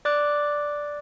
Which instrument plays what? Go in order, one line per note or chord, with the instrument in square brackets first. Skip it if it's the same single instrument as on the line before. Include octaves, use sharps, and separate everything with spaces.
[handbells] D5 D6 F#6